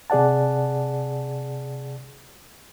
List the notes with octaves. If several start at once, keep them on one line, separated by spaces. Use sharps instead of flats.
C3 G#4 D5 F#5 A5